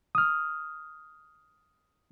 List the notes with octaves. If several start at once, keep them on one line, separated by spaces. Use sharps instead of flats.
D#6 F6